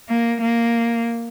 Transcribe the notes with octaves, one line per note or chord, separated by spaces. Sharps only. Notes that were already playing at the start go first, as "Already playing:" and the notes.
A#3
A#3